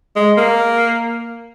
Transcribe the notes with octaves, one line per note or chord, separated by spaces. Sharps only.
G#3
A#3